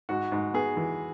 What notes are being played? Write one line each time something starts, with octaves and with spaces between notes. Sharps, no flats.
G#2 F#4
G#2
B3 G#4
E3